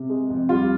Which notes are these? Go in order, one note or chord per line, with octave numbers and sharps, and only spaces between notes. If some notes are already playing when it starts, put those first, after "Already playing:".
Already playing: C3
G#3
F2
G3 F4